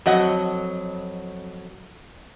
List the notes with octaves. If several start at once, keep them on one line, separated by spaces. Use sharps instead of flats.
F2 F#3 D#5 F#5